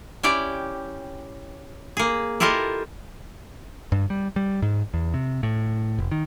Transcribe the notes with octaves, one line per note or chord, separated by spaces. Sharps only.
C#4 E4 G4 D5 G5
A#3 G#4
E4 F4 G4 A4 A#4 D#5
G2
G3
G3
G#2
E2
C3
A2
F1
D#3